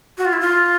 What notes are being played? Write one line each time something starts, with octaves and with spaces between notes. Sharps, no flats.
F#4
F4
E4
F4